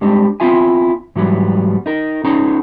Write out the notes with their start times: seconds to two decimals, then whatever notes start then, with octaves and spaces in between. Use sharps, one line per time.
0.01 G3 G#3 C4 D4 G4
0.40 B3 C4 E4 F4 E5 G#5
1.16 G#2 E3 F#3 G3 B3
1.86 D#4 A#4
2.24 B3 C#4 D#4 G#4 A#5